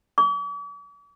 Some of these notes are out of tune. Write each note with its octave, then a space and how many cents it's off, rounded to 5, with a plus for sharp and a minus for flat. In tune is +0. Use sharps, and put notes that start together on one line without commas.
D6 -45